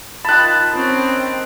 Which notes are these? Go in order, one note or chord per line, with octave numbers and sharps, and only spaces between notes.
D#3 F4 A5 B5 F#6
C4 C#4